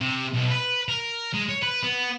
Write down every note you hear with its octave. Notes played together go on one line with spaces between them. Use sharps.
C3
B1
B4
A#4
G#3
C#5
B4
B3